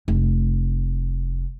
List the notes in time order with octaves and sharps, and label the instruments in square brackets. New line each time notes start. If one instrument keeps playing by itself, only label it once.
[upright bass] F1